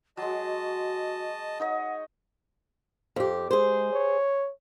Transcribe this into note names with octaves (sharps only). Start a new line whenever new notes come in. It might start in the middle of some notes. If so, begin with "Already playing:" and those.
F#3 G#3 F#4 D#5 A5
D#4 C#5 D#5 F#5
F2 G4
G#3 G#4 C5
C#5